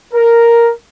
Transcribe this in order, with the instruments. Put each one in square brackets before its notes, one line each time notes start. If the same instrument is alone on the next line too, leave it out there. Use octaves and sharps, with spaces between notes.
[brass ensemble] A#4